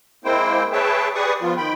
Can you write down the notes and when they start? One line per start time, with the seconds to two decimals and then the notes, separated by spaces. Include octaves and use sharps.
0.24 G#3 A#3 C4 E4 C5 G5
0.72 G#4 B4 C#5 E5 G5 A5
1.15 G4 G#4 B4 D5 C#6 D#6
1.42 F3 B3 F4
1.57 D#3 G5 B5